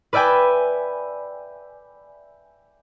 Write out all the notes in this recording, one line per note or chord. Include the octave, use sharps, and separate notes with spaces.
B4 D5 E5 G5 G#5